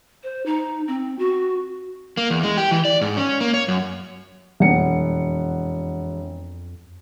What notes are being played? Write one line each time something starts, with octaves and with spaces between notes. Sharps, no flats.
C5
D#4
C4
F#4
A#3
E2
G#3
G4
E3
D5
G#2
C#4
A#3
C#5
F#2
E1 F2 F#5 C#7